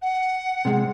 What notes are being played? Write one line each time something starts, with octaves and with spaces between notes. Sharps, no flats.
F#5
C3 G#3